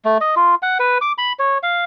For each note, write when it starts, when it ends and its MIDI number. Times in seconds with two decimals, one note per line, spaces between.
0.05 0.18 57
0.21 0.35 75
0.36 0.55 65
0.62 0.78 78
0.80 0.98 71
1.01 1.12 86
1.18 1.33 83
1.39 1.58 73
1.63 1.85 77